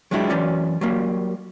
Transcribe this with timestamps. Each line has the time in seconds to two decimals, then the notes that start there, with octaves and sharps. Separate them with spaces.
0.11 F#3 G#3 D4 E4 G4
0.30 F#2 E3 C#4 D5
0.81 F#3 G3 A#3